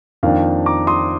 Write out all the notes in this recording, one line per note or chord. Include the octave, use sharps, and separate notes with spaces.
F2 D#3 A#3 D4 F5
A#5 D6
C6 D#6